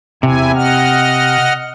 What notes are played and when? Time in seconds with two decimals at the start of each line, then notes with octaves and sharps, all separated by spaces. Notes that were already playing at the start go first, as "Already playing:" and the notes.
0.23 E2 C3 E4 G#5
0.55 D#5 F#5 F6